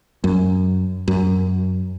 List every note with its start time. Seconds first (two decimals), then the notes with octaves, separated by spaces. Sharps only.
0.24 F#2
1.08 F#2